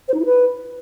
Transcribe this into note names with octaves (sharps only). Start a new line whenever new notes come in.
C5
D#4
E4
B4